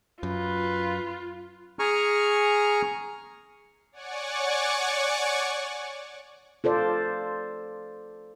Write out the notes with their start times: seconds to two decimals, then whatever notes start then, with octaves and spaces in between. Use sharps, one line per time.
0.23 F#2 F4 B4
1.79 G#4 G#5 A#5 C#6 F6
3.92 C#5 D5 F#5 G#5 C#6 D6
6.64 F4 A4 C5 D5